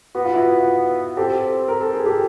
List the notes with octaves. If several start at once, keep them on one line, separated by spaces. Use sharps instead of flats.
B3 F#4
F4
E4 F#4
C4 G4 A4
A#4
A4
G#4
G4 A4